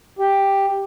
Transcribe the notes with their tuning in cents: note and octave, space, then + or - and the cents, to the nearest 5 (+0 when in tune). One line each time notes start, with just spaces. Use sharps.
G4 +5